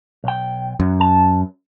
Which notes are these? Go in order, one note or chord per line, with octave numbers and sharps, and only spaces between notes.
B1 G5
F#2
A5